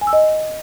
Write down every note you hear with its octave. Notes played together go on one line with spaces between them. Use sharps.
G#5
E6
D#5